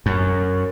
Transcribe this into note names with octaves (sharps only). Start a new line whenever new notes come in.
F#2